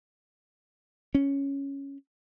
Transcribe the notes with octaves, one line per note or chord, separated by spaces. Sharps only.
C#4